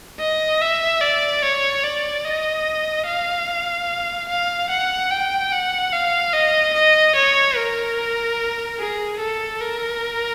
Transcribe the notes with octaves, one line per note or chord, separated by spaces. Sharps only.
D#5
E5
D5
C#5
D5
D#5
F5
F5
F#5
G5
F#5
F5
D#5
D#5
C#5
A#4
G#4
A4
A#4